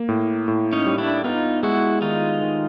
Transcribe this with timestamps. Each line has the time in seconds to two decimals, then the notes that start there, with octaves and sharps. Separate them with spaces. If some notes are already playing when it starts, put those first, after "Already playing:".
Already playing: A#3
0.09 A2
0.48 A2
0.73 C#4 D#4
0.86 G3
0.98 D4 E4
1.24 B3 D#4 F4
1.63 G#3 E4 F#4
2.02 D#3 D#4 F4
2.41 D#3